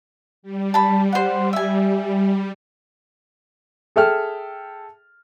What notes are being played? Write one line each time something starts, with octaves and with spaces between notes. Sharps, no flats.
G3
A5 B5
C5 F#5
E5 G#5
G#4 A4 E5 G5 F6